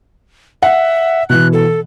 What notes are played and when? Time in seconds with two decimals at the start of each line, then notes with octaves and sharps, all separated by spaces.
0.63 E5 F#5
1.30 B2 E3 F#6
1.53 A4